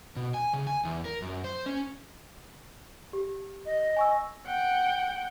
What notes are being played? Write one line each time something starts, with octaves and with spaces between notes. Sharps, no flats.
B2
G#5
C#3
G#5
E2
A#4
F#2
C5
C#4
G4
D#5
G#5 C#6 E6
F#5 G5